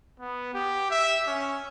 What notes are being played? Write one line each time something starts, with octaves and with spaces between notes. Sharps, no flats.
B3
G4
E5
C#4